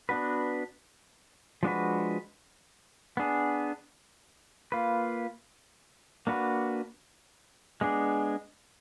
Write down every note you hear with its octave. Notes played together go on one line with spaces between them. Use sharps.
B3 D4 F#4 B4
F3 G#3 D4 F#4 B4
B3 D4 G#4
A#3 F4 B4
A#3 D4 F#4 B4
G#3 B3 D4 G#4